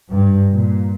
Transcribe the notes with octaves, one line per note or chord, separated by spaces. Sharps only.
G2
A#2